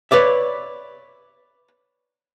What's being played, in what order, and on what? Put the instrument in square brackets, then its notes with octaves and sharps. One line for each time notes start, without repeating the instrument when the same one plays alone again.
[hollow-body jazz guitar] B4 C#5 D5 E5